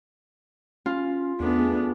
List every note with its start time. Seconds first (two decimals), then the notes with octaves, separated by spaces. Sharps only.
0.86 C#4 F4
1.40 E2 A3 B3 D4 G#4